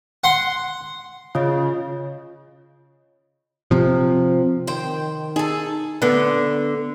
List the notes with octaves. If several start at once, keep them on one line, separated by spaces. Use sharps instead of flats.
F#5 C6
C#3 F4 C#5 D#5
C3 F3
D#3 C5 G5
D#4 G#4 A4
D3 B3